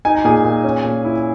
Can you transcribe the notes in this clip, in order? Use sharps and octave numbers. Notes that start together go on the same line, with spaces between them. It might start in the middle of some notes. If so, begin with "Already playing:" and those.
D#4 G#5
A#5
A#2 G#4 G#5
A#2
C#4
A#2
E4